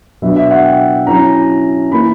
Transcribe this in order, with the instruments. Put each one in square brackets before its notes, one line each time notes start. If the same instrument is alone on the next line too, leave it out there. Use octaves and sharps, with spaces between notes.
[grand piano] B2 F#3 B3 D4 E5
E5
F#5
G5
F#3 C#4 E4 A#5
E3 A#3 E4 B5